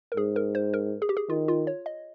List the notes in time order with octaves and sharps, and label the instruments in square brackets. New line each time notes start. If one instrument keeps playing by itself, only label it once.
[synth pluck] A#4
[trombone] G#2 [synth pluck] G#4
[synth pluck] A#4
C5
A#4
G#4
G4
G#4
[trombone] D#3 [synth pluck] F4
[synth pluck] F4
C#5
D#5